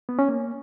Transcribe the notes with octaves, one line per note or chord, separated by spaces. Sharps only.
B3
C#4
A#3